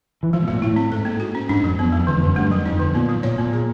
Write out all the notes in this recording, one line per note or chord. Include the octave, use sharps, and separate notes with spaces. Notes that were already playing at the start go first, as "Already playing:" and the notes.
E3
F3 G#3
B2
A2 A#2 G#3
A2 E4
C4
G#2 A4
A#3
F#4
C#4
G#2 D4
F#2 F3
F2 B3
G#3
E2 D3
F2
F#2 D3
G2 A3
F#2 F#3
F2 D#4
D3
A#2 B3
F#3
A#2 C#5
A#2 B3
G#4